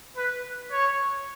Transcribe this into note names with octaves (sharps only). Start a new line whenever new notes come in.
B4
C#5